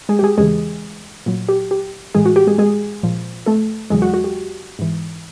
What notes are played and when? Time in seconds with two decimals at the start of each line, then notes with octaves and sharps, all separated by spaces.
0.09 G#3 G#4
0.19 G4
0.23 G#3 G#4
0.38 E2 C#3 E3 G#3 G#4
1.26 A#2 F#3
1.49 G4
1.71 G4
2.15 A2 E3 G#3 G#4
2.26 F#4
2.36 G4
2.47 G#3 G#4
2.58 G#3 G#4
3.03 A#2 F3
3.46 A3 A4
3.90 E2 C#3 F#3 G#3 G#4
4.02 F#4
4.14 F#4
4.24 G4
4.79 G#2 E3